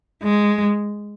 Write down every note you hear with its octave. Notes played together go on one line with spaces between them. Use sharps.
G#3